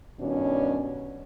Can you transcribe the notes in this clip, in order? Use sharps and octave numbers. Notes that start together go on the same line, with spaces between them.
G2 B2 D#3 C#4 D4